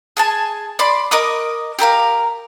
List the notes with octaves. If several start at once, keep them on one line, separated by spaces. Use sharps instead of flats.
G#4 G#5 A5
D5 B5 C6
A#4 D#5 D6 D#6
G4 A4 A#4 F5